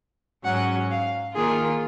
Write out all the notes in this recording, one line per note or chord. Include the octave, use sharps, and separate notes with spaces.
G#2 F#3 C#4 F#5
F5
D#3 A#3 F4 G#4